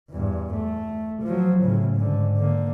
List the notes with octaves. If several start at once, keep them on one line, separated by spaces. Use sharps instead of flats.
E2 G2
A3
F3 F#3
A2 C#3
G#2 D3
D3 A#3